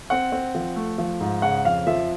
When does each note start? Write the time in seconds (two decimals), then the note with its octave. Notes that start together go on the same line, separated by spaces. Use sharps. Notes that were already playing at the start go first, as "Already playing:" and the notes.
0.10 C4 F#5
0.32 C4
0.55 F3
0.76 A3
0.98 F3
1.21 G#2
1.42 C#3 F#5
1.65 F2 F5
1.87 F3 E5